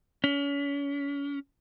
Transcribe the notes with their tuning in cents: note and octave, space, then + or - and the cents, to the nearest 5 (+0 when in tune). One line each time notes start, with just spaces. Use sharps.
C#4 +35